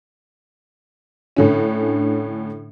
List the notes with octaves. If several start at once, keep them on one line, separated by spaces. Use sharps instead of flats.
A2 D3 C#4